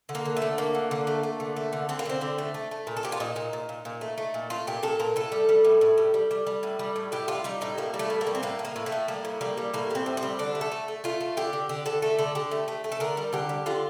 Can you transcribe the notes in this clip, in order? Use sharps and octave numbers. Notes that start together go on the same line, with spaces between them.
D3
A#3
D3
A3
D3
A3 A#3
D3
D3
A3
A3
D3
A3
D3
D3 C4
A#3
D3 C4
D3
A3
A3
A3
A#2
A4
A#2 G4
F4
A#2 D#4
A#2
A#2
A#2
A#2
A3
A3
A#2
A3 F4
A#2 G4
A#2 A4
A#2 A#4
A2 A4
G3
G3
A2
A2
G3
G3
G3
G3
A2
G3
A2
A2 G4
G3 F4
G3 D#4
A2 D#4
G3 A#3
G3
A3
A2
A#3
G3
C4
A2 A#3
A2
A#3
A2
A3
A2
G3 A#3
A2
G3 A#3
G3
A2 A#3
G3 C4
A2
C4
G3
D3 D4
A3
A4
A3
A3
A3 F4
A3
D3 G4
D3
D3 G4
D3 A4
A3 A4
D3 A4
D3 G4
A3
A3
A3
A4
D3 A#4
G3
D3 G4
G3
D3 F4